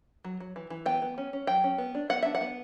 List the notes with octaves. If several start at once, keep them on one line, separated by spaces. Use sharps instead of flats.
F#3
F#3
E3
E3
B3 G5
B3
C#4
C#4
F#3 G5
C#4
B3
D4
B3 F#5
D4 E5
F#5
B3